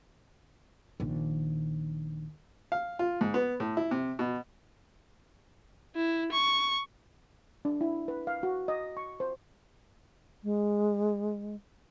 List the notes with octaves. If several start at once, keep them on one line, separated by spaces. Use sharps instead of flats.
A#1 D#3
F5
F4
G#2
B3
A2
E4
C3
B2
E4
C#6
D4
E4
B4
F5
F#4
D#5
C#6
C5
G#3